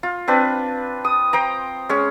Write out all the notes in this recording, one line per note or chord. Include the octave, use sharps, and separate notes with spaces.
F4
C4 D4 B4
D#6
C5 G5 A#5
G#3 C#4